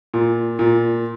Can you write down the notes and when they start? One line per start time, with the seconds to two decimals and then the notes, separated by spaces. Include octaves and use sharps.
0.14 A#2
0.59 A#2